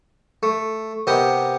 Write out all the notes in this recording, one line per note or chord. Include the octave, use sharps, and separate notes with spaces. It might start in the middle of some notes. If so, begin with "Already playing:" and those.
A3
C3 B3 G4 A#4 D#5